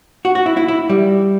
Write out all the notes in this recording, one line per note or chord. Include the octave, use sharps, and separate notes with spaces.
F#4
F#4
E4
E4
E4
G3